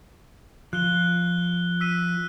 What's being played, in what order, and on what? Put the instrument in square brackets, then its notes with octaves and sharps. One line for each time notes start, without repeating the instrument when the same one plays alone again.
[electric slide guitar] F3 [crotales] F#6 G7
[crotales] E6 B6 D#7